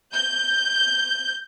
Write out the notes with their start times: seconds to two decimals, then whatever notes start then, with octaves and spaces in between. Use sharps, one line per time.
0.13 G6